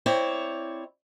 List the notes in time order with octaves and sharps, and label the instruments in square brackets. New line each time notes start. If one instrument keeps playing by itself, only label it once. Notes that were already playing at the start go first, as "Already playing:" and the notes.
[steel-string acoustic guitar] C4 E4 C#5 D5